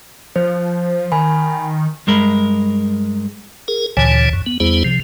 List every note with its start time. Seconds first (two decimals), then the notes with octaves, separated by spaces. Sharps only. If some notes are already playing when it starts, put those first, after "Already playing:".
0.36 F3 C5
1.12 D#3 G#5 B5
2.07 G2 G#3 A#4 B5
3.68 G#4 A#4
3.97 D2 A#2 D3 E3 C#5 G#5
4.33 F#2
4.46 B3
4.60 E2 G3 B3 E4 G#4 C5
4.85 C3 F3